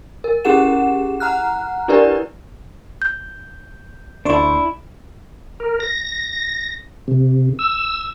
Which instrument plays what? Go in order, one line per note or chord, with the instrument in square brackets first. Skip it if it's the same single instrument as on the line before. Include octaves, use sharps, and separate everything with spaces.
[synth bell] A#4
C#4 E4 G4 G#4 F#5 E7
F#5 A#5 F6 F#6
D4 E4 G4 A#4 B4 D5
[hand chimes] G6
[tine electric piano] D2 C6 C#6 [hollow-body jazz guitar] D4 E4
[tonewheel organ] A#4
A#6
C3
E6